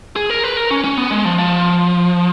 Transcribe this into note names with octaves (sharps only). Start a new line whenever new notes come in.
G#4
A#4
B4
A#4
C#4
C#4
B3
G#3
F3
F3